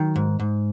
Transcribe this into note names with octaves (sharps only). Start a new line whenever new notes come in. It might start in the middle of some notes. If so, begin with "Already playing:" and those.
Already playing: D#3 F#3
G#2
G#2